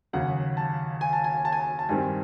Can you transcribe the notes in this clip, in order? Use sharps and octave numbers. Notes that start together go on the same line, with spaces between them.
D#2 C#3 F#3 F#5
A5
G#5
A5
G#5
A5
G#5
A5
A5
G2 D#3 G3 C4 G#5